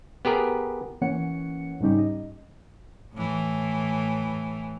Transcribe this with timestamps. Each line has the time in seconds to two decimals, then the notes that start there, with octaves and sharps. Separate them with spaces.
0.25 B3 G4 G#4 A#4
1.01 E3 A#3 C#4 C#5 F#5 C#7
1.80 G#2 C#3 G3 C#4 D#4 G4
1.98 D#5
3.13 A2 E3